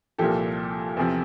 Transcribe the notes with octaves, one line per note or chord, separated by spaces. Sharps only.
C2 A#2 F3 G4 A4
E2 C3 F3